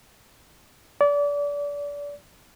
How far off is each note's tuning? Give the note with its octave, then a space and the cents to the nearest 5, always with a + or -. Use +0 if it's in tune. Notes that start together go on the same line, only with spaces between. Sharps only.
D5 -30